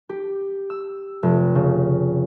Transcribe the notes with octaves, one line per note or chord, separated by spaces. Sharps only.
G4
E6
F1
C#3